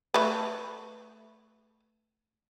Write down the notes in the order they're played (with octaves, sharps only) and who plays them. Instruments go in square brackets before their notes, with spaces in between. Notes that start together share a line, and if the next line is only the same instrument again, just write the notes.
[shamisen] A3 B4